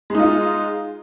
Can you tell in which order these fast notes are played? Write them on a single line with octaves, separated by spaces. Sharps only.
G#3 D#4 F4